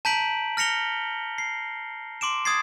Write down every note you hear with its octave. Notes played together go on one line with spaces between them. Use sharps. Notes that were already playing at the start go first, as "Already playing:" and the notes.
A5 A#5 G6 B6 D7 F#7
F6 A#6 C#7 F7 G7
C7
C6 D6 D7 E7
D#6 G#6 A6 C7